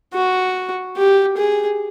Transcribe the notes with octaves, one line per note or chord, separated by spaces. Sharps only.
F#4
G4
G#4